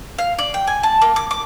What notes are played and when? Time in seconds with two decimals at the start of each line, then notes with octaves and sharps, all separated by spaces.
0.18 F5
0.38 D5
0.54 G5
0.67 G#5
0.83 A5
1.02 A#3
1.16 D6
1.31 D6